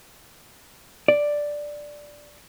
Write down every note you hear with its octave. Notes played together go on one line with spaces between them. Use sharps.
D5